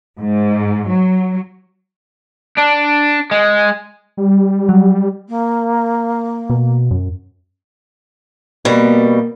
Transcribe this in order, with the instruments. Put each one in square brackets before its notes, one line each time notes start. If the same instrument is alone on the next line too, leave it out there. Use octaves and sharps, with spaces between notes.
[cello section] G#2
F#3
[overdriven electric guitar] D4
G#3
[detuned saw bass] G3
[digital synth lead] F#3
[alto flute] A#3
[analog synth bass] B2
F#2
[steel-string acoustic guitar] B2 G3 [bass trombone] A#3